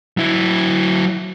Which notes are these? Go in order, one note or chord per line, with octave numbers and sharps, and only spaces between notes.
F#3 E4